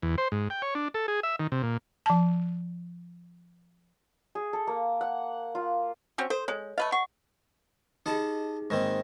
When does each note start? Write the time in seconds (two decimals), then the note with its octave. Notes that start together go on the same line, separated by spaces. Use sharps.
0.02 E2
0.18 C5
0.32 G#2
0.50 G5
0.62 C#5
0.75 D4
0.94 A4
1.08 G#4
1.23 E5
1.39 D#3
1.52 C3
1.63 A#2
2.06 F3 A5
4.35 G#4
4.53 A4
4.67 A#3
5.01 F#5
5.55 F4
6.18 C4 C#4 F#4
6.30 A4 C5
6.48 G#3 C#5 G#5
6.78 A3 B4 D#5 F5
6.92 F#5 C#6
8.06 D#4 G4 G#4 D#5 A5 B5
8.70 G#2 D#3 A#3 C4 D#5 A#6